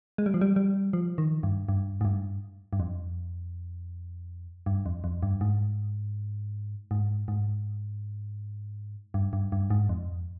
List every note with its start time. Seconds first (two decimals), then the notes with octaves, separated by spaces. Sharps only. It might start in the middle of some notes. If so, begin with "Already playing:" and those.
0.18 G#3
0.26 G3
0.34 F3
0.41 G3
0.56 G3
0.93 F3
1.18 D#3
1.43 G2
1.69 G2
2.01 G#2
2.05 G2
2.73 G2
2.80 F2
4.66 G2
4.86 F2
5.04 F2
5.23 G2
5.41 G#2
6.91 G#2
7.28 G#2
9.14 G2
9.33 G2
9.52 G2
9.70 G#2
9.89 F2